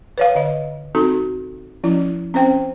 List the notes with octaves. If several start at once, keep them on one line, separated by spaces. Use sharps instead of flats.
B4 C#5 F5
D3 D#5
C4 D#4 F#4 A4
F3 C#4 E4
C4 C#4 C5 G5